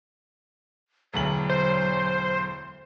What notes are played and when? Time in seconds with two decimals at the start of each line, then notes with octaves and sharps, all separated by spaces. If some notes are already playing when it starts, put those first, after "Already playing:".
1.14 E1 D2 F#3 F#7
1.50 C5